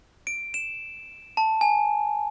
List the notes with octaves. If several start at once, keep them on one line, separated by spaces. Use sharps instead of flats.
D7
E7
A5
G#5